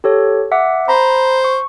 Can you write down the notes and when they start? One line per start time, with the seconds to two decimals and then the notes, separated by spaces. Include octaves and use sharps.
0.04 G4 A4 C#5
0.52 E5 F#5 D6
0.88 C5 A#5 B5
1.44 C#6